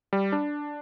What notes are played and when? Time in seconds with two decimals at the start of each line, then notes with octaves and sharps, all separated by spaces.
0.13 G3
0.32 D4